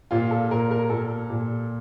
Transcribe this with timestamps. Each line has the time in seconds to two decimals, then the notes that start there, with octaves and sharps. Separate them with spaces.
0.11 A#2 F4
0.31 A4
0.51 A#2 A#4
0.71 A#4
0.90 A#2 A4
1.30 A#2